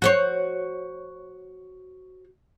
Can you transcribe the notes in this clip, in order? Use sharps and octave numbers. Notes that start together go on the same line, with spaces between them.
F#4 C5 C#5